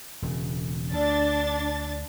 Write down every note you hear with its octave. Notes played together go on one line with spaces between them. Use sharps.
E1 C#3
D2 D4 A6